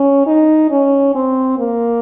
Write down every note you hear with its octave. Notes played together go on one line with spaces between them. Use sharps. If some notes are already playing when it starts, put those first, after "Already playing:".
Already playing: C#4
D#4
C#4
C4
A#3